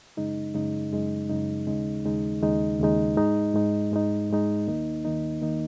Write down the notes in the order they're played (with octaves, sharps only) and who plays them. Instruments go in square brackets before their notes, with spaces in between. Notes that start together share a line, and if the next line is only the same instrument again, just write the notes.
[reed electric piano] F#2 C#3 G#3 D#4
F#2 C#3 G#3 D#4
F#2 C#3 G#3 D#4
F#2 C#3 G#3 D#4
D#2 C#3 G#3 D#4
D#2 C#3 G#3 D#4
D#2 C#3 G#3 D#4
D#2 C#3 G#3 D#4
G#2 G#3 D#4
G#2 G#3 D#4
G#2 G#3 D#4
G#2 G#3 D#4
D#2 D#3 A#3 D#4
D#2 D#3 A#3 D#4
D#3 A#3 D#4